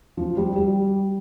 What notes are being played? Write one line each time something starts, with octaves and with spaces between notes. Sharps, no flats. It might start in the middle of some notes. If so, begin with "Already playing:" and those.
F3
G3
G3